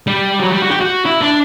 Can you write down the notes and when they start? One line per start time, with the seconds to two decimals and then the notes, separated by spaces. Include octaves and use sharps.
0.07 G3
0.39 F#3
0.51 G3
0.62 F#4
0.71 G4
0.81 F#4
1.05 E4
1.21 D4